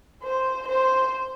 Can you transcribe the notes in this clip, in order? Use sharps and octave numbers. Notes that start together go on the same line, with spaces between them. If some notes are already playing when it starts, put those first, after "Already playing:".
C5
C5